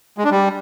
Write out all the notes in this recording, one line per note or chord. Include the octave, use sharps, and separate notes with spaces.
G#3
D4
G3